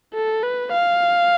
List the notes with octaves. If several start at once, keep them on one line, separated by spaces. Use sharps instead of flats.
A4
B4
F5